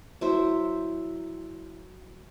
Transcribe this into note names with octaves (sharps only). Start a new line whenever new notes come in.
F#3 E4 C5